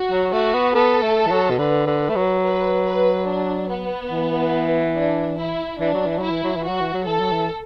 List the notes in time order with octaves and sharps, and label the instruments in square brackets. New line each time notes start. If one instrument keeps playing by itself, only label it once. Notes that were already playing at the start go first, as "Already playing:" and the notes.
Already playing: [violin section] F#4
[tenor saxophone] F#3
[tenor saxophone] A3 [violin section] F#4
[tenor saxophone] B3
[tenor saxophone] B3 [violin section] A4
[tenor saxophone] A3
E3
F#3
B2
[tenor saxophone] D3 [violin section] B4
[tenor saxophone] D3
A3
F#3
[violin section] B4
B4
D4
B3
[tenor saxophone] E3
[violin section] D4
E4
[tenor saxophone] E3 [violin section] D4
[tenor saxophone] F#3
E3
[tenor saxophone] F#3 [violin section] E4
[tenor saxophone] E3
F#3
E3
[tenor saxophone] F#3 [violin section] F#4
[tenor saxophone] E3
F#3
[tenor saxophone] E3 [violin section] A4
[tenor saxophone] F#3
E3